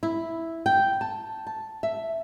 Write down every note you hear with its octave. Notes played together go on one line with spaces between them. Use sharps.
E4
G5
A5
A5
E5